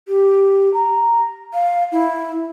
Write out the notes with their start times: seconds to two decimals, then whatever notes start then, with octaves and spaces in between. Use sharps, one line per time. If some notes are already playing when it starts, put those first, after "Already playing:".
0.08 G4
0.74 A#5
1.54 F5
1.92 E4